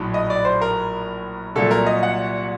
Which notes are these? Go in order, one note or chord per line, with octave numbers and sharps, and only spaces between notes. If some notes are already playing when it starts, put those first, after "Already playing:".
Already playing: A#1 A2 F#3
D#5
D5
C5
A#4
C2 A#2 F#3 A4
A#4
D#5
F#5